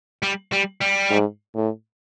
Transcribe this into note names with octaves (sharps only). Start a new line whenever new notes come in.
G3
G3
G3
G#2
A2